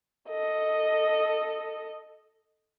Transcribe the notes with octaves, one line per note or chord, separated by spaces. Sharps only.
A4 D#5